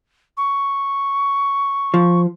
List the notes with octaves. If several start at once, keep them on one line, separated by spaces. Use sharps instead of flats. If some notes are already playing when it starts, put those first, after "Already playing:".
C#6
F3